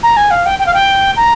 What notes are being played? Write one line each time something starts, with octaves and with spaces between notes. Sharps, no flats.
A#5
G#5
F5
G5
G5
F5
G5
A#5